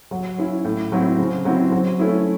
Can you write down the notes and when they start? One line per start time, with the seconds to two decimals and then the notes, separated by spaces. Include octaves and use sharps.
0.11 F#3
0.38 C#4 E4
0.65 A2
0.92 F#3 C4 E4
1.18 C#3
1.45 F#3 C4 E4
1.72 F#3
1.99 A3 C#4 E4